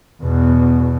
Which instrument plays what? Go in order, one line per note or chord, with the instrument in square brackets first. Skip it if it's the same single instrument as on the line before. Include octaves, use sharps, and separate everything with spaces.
[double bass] E2 B2